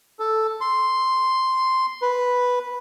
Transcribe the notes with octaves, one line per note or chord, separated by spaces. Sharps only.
A4
C6
B4